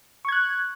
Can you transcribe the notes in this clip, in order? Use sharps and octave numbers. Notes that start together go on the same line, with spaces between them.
C#6 F#6 G#6